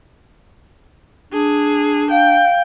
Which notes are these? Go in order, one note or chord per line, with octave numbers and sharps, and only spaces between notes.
D4 G#4
F5 G5